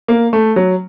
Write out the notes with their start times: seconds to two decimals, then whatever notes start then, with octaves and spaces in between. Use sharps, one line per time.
0.08 A#3
0.33 A3
0.56 F#3